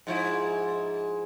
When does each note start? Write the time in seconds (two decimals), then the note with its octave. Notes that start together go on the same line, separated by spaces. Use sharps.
0.07 G#2 F3 E4